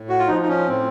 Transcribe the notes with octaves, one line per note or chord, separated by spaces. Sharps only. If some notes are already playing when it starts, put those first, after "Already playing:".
Already playing: A2
F#4
F4
F3 D#4
D#4
C#4
A2 C4